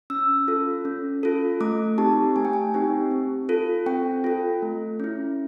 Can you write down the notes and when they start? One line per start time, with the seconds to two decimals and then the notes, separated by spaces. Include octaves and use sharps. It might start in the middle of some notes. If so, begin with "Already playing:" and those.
0.10 C#4 E6
0.48 F4 A4
0.85 C#4
1.23 F4 A4
1.61 A3 D6
1.98 C4 D#4 G4 A5
2.36 A3 G#5
2.45 G5
2.53 G#5
2.74 C4 D#4 G4
3.11 C4
3.49 F4 A4
3.86 C4 G5
4.24 F4 A4
4.62 A3
5.00 C#4 E4